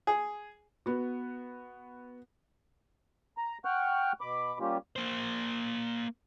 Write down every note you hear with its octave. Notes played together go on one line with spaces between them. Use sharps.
G#4
B3 F#4
A#5
F#5 G5 C#6 F6 F#6
B2 B5 D6
G3 A#3 C#4 F4 G4
A#3 C5